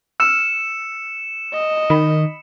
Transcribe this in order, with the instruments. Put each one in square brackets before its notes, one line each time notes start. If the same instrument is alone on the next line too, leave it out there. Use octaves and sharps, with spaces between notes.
[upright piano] E6 F6 [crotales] C#7 E7
[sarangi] D#5
[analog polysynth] D#3 [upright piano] B5